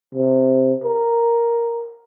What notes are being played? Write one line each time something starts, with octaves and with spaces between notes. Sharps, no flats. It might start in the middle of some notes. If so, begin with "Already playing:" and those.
C3
A#4